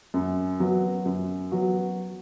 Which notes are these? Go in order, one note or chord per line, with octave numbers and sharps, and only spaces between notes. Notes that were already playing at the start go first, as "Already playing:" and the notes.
F#2
F#3 B3 F#4
F#2
F#3 B3 F#4